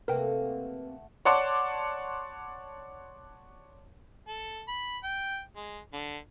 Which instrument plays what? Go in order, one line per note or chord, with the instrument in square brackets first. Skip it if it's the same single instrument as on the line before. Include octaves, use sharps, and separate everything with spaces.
[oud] C3 A#3 [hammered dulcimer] A3 F#5 [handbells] A#4 G5 [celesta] B4
[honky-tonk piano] C#5 D5 F#5 A5 C6 D6
[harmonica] A4
B5
G5
G#3
D3